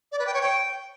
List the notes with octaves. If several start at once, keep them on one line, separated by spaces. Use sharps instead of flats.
D5
B4
G5
C#5
G5